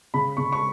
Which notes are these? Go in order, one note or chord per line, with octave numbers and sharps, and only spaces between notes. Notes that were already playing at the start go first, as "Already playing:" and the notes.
C#3 B5
C#3 C#6
C#6